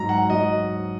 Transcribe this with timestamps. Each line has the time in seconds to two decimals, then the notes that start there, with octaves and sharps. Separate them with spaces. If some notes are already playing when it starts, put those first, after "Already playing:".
Already playing: G#2 F#3 A#5
0.09 F#5
0.30 F#3 D#5